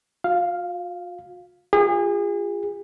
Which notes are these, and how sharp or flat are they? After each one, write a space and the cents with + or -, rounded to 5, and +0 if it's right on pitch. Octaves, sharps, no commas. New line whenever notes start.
F4 +45 F5 +0
F4 +0 G#4 -35